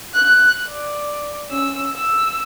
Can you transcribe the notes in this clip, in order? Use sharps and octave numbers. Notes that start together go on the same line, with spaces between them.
F#6
D5
C#4 E6
E6